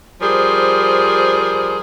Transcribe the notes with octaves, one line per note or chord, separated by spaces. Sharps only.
F3 G3 G#4 A#4 C5